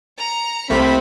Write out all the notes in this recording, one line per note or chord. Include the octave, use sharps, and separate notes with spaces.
A#5 C#7
C2 C3 A3 A#3 C4 B5